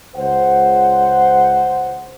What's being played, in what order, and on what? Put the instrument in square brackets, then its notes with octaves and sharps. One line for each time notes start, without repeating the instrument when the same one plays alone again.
[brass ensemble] C#2 C5 F#5